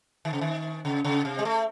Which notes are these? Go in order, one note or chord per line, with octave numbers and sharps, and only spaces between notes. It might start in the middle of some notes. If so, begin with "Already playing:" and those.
D#3
C#3
D#3
C#3
C#3
C3
G#3
A3